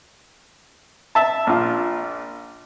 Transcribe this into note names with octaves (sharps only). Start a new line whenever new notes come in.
E5 A5
A#1 F4